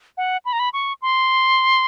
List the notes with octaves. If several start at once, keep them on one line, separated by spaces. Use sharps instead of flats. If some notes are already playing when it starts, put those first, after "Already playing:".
F#5
B5
A#5
B5
C#6
C6